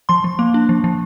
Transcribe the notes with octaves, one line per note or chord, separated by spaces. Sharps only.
F3 C6
F3
A#3
D4
F3
F3